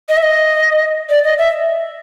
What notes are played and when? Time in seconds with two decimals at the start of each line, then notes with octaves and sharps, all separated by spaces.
0.09 D#5
0.17 E5
0.23 D#5
1.09 D5
1.24 D#5
1.38 E5